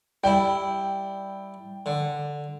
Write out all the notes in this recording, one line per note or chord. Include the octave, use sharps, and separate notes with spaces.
G3 E4 G5
D3